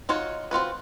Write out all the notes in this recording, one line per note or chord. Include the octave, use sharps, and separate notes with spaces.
D#4 F4 F#4 C#5
C4 F4 F#4 B4